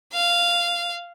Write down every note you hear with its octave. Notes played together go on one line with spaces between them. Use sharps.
F5